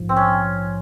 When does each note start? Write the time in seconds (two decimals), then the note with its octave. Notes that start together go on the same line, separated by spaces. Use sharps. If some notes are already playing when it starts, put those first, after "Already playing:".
Already playing: A#1 G#2 F3
0.09 C4
0.16 C#4